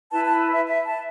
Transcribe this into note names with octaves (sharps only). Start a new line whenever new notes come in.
E4 B4 A5
A5
E5
E5
A5